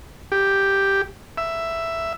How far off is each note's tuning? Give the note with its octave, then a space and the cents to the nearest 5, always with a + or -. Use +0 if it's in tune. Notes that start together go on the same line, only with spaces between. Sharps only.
G4 +0
E5 +5